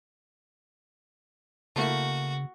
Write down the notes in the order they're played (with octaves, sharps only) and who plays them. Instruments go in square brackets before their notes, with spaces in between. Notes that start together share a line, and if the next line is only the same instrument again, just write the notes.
[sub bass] C#3 [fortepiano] A3 A#3 E4 [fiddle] F#4